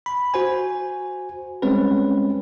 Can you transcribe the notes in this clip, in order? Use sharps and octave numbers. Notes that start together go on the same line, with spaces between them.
B5
F#4 C5 G#5
G3 G#3 C4 C#4 B4